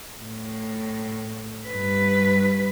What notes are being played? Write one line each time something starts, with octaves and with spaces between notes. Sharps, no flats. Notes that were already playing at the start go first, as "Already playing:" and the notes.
A2
G2 B4